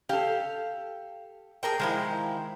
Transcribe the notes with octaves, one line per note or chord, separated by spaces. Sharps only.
G4 A4 F5
G#4 A#4 G5
D#3 F3 G#3 E4